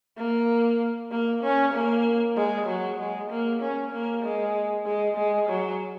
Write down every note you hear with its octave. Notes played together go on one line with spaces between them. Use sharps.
A#3
A#3
C#4
A#3
G#3
F#3
G#3
A#3
C#4
A#3
G#3
G#3
G#3
F#3